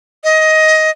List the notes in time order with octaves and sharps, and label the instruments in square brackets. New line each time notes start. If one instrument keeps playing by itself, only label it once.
[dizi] D#5